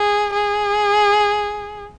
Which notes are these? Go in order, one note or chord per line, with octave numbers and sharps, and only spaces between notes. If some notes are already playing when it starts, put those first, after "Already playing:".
Already playing: G#4
G#4